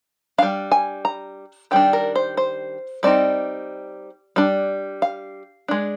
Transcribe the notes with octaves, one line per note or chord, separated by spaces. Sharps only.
G3 D4 F5
G#5
A#5
D#3 G3 D4 G5
A#4
C5
C5
G3 C4 D#4 D5
G3 D4
F5
G#3 D4